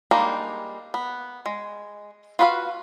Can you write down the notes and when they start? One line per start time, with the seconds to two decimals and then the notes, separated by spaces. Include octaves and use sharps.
0.11 G3 G#3 A#3 D4 D#4
0.94 B3
1.46 G#3
2.39 F4 F#4 B4 C5 F5